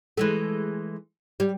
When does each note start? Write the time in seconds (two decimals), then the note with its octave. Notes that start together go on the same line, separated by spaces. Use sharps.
0.17 E3 G#3 A3
1.40 G3